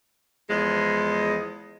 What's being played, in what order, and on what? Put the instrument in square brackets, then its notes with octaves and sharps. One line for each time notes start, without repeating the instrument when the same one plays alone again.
[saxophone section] E2 F3 G#3